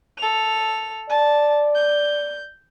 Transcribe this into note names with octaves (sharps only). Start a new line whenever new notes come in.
A4 F7
D5 A5
G6